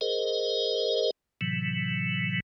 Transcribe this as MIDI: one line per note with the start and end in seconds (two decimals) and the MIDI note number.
0.01 1.11 68
0.01 1.11 70
0.01 1.11 72
0.01 1.11 75
1.41 2.40 45
1.41 2.40 48
1.41 2.40 52
1.41 2.40 54